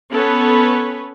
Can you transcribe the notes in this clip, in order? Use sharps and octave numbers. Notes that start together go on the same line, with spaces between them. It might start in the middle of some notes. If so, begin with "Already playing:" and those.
B3 C#4 A4 B4 C#5